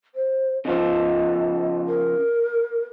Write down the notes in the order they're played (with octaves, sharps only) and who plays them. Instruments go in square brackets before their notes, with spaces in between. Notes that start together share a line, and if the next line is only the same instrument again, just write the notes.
[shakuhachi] C5
[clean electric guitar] C#3 F3 F4 [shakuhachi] D#5
[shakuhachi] A#4